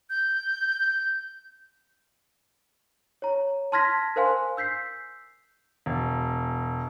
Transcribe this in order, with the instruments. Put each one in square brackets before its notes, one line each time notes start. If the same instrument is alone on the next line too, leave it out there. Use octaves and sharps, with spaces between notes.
[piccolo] G6
[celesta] C#5 A#5
A5 C6 F6 G#6 A#6 B6
A#4 C5 F5 G#5 C6
E6 G6 B6 C7
[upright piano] E1